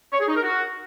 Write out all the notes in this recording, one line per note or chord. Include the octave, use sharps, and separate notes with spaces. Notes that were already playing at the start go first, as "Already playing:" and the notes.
C#5
G#4
D#4
A#4
F#4